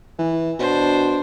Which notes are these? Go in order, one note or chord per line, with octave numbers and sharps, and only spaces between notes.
E3
B2 D4 C5